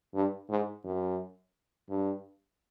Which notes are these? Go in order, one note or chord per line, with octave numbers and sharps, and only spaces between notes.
G2
G#2
F#2
G2